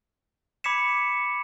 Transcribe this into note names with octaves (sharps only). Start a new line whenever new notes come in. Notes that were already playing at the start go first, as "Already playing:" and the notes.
B5 D6 G#6 B6 C#7 E7